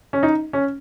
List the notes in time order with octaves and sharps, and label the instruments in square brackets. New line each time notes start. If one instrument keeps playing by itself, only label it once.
[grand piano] C#4
D#4
C#4